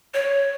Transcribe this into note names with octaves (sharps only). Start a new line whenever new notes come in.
C#5